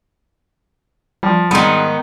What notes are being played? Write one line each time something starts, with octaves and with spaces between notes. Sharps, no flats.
F3 G3
G#2 D#3 G3 B3